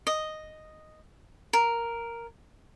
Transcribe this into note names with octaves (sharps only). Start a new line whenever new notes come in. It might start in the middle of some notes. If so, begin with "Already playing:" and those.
D#5
A#4